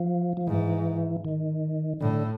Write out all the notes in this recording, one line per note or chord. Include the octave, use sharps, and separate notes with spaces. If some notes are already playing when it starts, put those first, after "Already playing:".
Already playing: F3
F3
G#2 E3
D#3
A2 D3